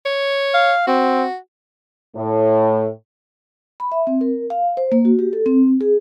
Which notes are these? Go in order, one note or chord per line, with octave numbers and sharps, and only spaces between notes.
C#5
F5
C4 F#4
A2
B5
E5
C4
A#4
F5
C5
A#3
F#4
G4
A4
C4
G#4